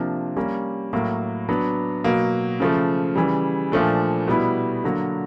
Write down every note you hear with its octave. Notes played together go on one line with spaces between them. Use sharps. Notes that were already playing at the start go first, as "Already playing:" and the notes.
Already playing: C3 F3 A#3 D4
G3 A#3 C#4
A2 F#3 A#3
F#3 B3 D4
B2 F#3 A#3
C#3 F3 A3
C#3 E3 G3
A#2 F3 A3 D4
B2 G3 B3 E4
D3 F#3 A#3